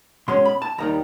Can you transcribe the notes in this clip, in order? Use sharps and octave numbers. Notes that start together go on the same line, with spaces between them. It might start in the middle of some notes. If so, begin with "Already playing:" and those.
B2 G#3 C#4 C6
B5
A5
D#2 D#3 G3 A#5